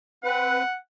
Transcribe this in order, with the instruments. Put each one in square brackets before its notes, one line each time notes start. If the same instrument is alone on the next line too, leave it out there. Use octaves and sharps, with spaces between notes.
[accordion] C4 B4 [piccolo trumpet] F#5